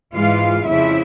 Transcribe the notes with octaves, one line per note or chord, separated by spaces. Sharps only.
G#2 E3 G#3 F4 F5
F2 C#3 F3 E4 E5